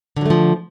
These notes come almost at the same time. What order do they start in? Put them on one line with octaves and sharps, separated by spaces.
D3 F#3 A3 F3